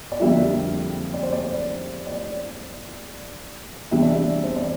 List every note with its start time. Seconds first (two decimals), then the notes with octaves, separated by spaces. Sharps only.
0.12 D5
0.20 F2 D3 G3 A#3 F4 E5
1.14 D5
1.23 C5
1.33 D5
2.07 D5
3.91 E2 C3 G3 D4 E5
4.02 D5
4.13 E5
4.43 C5
4.56 D5